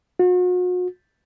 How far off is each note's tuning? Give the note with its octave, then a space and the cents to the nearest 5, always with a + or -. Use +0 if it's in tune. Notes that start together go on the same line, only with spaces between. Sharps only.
F#4 -40